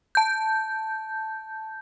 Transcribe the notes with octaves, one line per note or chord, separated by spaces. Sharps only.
A5 G6